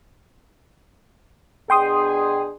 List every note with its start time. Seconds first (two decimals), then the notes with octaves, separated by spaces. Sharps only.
1.70 B2 D4 G#4 G5 C6 D#6